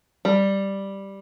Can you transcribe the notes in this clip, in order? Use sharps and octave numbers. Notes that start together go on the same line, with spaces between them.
G3